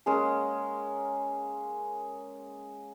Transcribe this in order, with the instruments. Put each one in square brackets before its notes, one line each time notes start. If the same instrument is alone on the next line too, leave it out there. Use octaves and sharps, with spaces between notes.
[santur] G#3 A#3 C#4 G#4